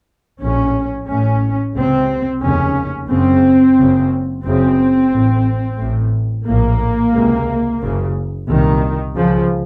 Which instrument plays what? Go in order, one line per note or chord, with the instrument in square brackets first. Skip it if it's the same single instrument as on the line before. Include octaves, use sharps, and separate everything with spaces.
[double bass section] A#1 A2 C#4
A1 A2 C#4
C#2 C3 C4
F1 D#2 C#3 C#4
F#1 F#2 C#3 C4
F#1 F#2 C#3
F#1 F#2 C#3 C4
A1 A2
A1 A2
A#1 A2 A#3
C#2 C3
F#1 F#2 C#3
C2 A#2 D#3
C#2 C#3 F3